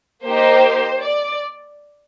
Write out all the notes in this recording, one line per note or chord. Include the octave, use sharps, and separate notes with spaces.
A#3 D#4 G4 C5
D5